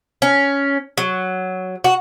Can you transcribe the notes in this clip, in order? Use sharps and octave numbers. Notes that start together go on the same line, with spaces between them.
C#4
F#3
F#4